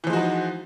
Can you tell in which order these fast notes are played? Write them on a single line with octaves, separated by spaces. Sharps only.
E3 F3 G#3 F#4 D#4